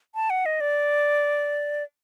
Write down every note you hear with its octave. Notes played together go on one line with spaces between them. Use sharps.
A5
F#5
D#5
D5